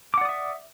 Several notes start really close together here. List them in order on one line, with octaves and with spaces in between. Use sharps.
D6 F#5 D5 D#6 E5